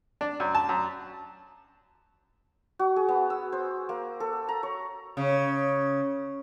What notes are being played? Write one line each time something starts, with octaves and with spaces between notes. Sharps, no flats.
D4
F#2
A5
F#2
F#4
G#4
B3
E6
C5
A#3
A4
A#5
C#5
C#3